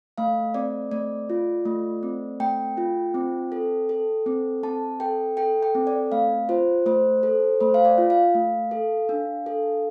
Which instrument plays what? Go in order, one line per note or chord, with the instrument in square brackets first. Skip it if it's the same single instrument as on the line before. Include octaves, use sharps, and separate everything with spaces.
[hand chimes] A3 F5
C4 D5
A3 D5
F4
A3
C4
A3 G5
F4
C4
A4
A4
C4
C4 A5
A4 G5
A4 G5
G5
C4
D5
A3 F5
F4 C5
A3 C5
A4
A3 C5
F5
D5
F4
F5
A3
A4
D4
A4